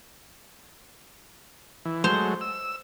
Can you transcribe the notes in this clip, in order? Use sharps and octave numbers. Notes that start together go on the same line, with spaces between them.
E3
F#3 G#3 A3 C5
E6